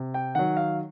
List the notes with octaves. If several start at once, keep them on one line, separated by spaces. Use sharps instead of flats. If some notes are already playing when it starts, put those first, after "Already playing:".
Already playing: C3
G5
D#3 F#3 F#5
F5